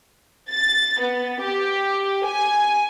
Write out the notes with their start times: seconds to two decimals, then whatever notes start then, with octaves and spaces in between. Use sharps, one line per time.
0.50 A6
1.01 B3
1.41 G4
2.25 G#5